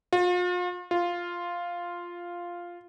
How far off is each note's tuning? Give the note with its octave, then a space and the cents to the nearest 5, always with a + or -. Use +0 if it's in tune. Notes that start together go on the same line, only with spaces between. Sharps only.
F4 +40
F4 +0